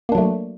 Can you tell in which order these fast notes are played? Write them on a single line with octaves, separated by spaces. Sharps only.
A#3 D4 F#3 A3